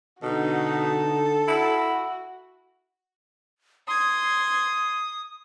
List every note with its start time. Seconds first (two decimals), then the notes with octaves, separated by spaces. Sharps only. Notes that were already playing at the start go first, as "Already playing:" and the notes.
0.23 B2 D3 D#4 F#4 A4
1.48 E4 F#4
3.88 C6 D#6 G#6